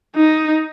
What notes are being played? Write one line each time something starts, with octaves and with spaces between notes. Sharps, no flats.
D#4